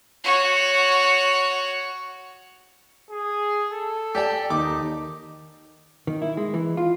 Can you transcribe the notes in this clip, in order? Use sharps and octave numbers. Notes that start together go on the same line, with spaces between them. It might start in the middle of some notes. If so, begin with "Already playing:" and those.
F#4 C#5
G#4
A4
G4 D5 G5
D#2 D#4 D6
D#3
E4
G#3
E3
F4